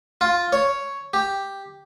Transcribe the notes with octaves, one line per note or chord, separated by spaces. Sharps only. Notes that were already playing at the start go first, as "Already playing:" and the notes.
F4
C#5
G4